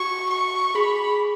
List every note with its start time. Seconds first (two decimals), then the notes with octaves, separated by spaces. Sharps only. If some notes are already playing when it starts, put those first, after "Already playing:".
Already playing: F#4 C#6
0.31 C#6
0.75 G#4 B5